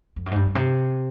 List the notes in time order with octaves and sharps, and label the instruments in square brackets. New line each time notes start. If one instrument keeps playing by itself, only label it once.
[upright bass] F2
F#2
G#2
G2
G2
C3